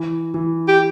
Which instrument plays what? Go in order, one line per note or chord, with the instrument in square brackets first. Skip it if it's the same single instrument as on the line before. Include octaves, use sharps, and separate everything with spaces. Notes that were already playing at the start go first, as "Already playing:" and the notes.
Already playing: [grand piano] E3
E3
[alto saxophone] G4